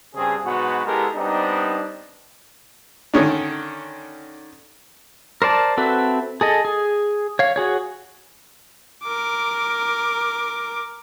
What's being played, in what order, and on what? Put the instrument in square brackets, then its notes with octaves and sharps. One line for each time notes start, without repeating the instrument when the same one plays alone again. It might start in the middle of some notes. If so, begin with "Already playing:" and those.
[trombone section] G2 C#3 C4 G#4
G#2 B2 F#3 B3 F#4
G#3 B3 E4 G4 A4 A#4
G3 B3 C4 D4 D#4
[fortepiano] D3 D#3 C#4 D4
[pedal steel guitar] A#4 C5 D5 A5
C4 F#4 A4 B4 E5
G#4 A4 D#5
G#4
C#5 F5
F#4 G#4 C#5
[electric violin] A#4 D6